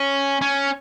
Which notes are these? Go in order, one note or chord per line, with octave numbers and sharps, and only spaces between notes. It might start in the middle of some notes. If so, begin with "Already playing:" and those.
Already playing: C#4
C#4